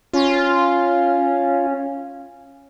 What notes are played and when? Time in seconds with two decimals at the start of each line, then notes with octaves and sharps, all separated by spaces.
0.13 C#4 F4